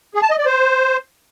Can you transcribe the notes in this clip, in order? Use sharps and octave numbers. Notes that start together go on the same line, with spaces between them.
G#4
A5
D#5
D5
C5